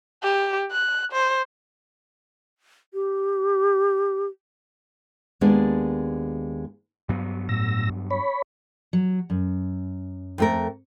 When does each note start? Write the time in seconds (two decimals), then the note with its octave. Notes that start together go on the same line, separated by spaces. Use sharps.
0.23 G4
0.71 F#6
1.12 C5
2.94 G4
5.41 D#2 G#3 B3 D4 D5
7.09 G2 F#3 B3
7.49 A2 E6 A#6
8.11 C#5 B5
8.93 F#3
9.30 F#2
10.38 F2 A3 A#4